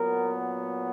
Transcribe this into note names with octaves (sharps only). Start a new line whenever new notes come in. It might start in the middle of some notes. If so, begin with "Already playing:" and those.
Already playing: A#2 F#3 B3 A#4